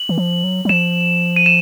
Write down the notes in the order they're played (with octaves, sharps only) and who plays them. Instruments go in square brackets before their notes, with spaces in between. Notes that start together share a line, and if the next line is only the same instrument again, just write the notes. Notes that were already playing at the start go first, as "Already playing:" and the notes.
Already playing: [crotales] F#7
[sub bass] E3
F3
F#3
F#3
[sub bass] F3 [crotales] E7
[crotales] D#7
E7